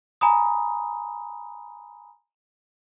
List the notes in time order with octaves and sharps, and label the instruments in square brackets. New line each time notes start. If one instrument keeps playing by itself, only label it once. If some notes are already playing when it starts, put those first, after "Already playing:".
[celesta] G#5 A#5 B5 D#6